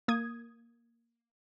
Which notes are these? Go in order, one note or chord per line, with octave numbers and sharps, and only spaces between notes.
A#3 D#6 G#6